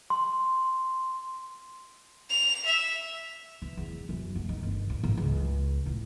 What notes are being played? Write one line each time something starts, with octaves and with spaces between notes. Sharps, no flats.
C6
F7
E5
E3
E2
F#2
A3
D#3
G1
A#2
A1
C#2
A2